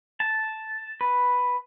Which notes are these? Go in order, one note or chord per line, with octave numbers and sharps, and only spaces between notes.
A5
B4